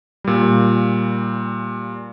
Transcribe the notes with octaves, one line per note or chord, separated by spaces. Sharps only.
A#2 G3